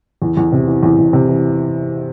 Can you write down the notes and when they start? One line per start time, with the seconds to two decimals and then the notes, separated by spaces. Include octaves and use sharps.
0.22 E2
0.37 E2
0.52 C3
0.67 E3
0.83 E2
0.98 E2
1.13 C3
1.29 E3